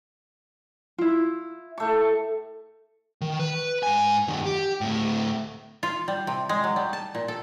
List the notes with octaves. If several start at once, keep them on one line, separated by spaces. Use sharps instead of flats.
E4 F4
A2 A3 C#6
D#3
B4
G#2 G#5
F#2 D#3
G4
D2 A2
F4
G3
C3
G#3
F#3
G3
A5
A#2
A4